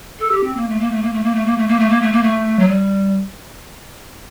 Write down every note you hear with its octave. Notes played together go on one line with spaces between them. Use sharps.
A4
G4
C4
A#3
A3
A#3
A3
A#3
A3
A#3
A3
A#3
A3
A#3
A3
A#3
A3
A#3
A3
F#3
G3